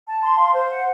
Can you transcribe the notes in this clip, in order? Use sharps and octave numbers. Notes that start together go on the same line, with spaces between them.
A5
C6
F5
C5
F#5